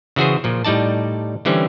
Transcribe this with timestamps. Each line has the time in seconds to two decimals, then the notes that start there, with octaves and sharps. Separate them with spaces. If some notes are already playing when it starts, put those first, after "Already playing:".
0.16 C#3 E3 F#4 G#4 C5
0.44 A#2 F3
0.65 A2 G3 D#4 D5 A5
1.45 D3 E3 G3 C4 C#4